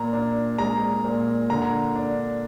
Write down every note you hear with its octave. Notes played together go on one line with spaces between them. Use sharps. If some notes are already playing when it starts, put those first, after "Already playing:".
Already playing: A#2 A#5
D4
G#3 A#5
A#2
D3 A#5
D4